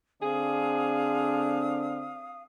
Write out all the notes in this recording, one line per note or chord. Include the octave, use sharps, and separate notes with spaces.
D3 C4 D4 G#4 F5 D#6